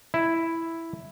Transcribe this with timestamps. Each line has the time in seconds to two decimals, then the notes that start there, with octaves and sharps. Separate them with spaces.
0.14 E4